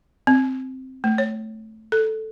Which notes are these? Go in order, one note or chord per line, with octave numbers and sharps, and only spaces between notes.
C4
A3
C#5
A4